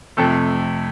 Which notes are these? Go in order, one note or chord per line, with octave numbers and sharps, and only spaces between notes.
F2 C3 A3 A4